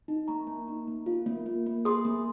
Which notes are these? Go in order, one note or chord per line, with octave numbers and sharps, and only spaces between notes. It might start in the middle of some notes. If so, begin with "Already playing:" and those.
D#4
A#3 A#5 C#6
A#3
D#4
A#3
F4
A#3
A#3
A#3
G#4 C6 D#6
A#3